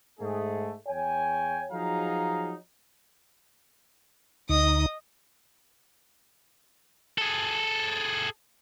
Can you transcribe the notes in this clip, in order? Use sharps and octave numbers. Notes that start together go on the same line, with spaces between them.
G#2 A3 G#4
E2 C#5 G5 G#5
F3 F#3 D#4 G#4 F5 A#5
D2 D#4 D#5 D#6
G#4 A4